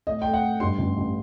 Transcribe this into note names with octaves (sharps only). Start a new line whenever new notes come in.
A2 D#5
A3 G5
F#5
A3
G2 C6
A1
A1